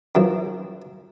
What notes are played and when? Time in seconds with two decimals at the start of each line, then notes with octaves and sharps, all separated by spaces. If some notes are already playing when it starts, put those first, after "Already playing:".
0.15 F#2 E3 F3